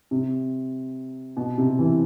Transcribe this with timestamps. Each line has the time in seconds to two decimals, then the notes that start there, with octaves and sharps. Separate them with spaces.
0.11 C3
1.37 B2
1.58 C3
1.79 E3